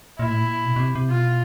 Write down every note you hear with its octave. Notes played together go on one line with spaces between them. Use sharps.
A#2 E4
A2
A#2
B2
B2
C3
C3
B2 F4